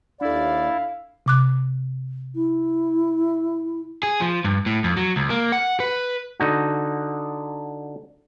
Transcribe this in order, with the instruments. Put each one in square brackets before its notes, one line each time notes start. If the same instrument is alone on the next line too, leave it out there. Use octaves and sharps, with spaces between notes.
[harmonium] D#2 D5 [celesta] D4 A4 [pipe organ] E4 [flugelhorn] F5
[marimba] C3 D6 F#6
[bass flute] E4
[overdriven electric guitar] G#4
F3
G2
A2
F2
F#3
C#2
A#3
F#5
B4
[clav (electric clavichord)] D3 D#4 F#4